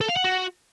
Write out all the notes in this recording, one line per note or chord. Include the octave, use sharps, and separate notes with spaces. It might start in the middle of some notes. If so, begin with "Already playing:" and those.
A4
F5
F#5
F#4